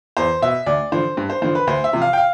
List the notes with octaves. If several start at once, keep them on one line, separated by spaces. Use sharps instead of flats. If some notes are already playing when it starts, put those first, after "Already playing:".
E2 C5
B2 E5
D2 D5
D3 F3 C5
G2
C5
D3 F3 C5
B4
D2 C5
E5
C3 F3
F5
G5
F5